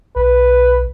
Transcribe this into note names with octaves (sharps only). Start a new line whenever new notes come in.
B1 B4